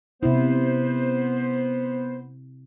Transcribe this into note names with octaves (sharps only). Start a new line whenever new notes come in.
C3 B3 E4 C5